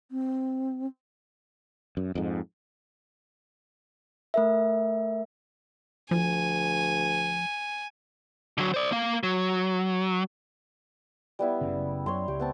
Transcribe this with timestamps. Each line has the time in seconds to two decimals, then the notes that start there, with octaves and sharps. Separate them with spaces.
0.11 C4
1.97 F#2
2.15 F2 G#2
4.34 A3 A#4 E5
6.11 D2 F3 G#5
8.58 D3 F#3
8.74 C5 D5
8.92 A#3 F5
9.23 F#3
11.39 G3 B3 E4
11.61 F#1 C#3
12.06 F#2 C#5 C6
12.28 C#2 G4
12.40 B3 C4 A5